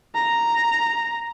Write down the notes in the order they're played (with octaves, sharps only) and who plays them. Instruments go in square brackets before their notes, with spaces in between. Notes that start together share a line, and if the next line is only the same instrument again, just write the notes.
[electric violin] A#5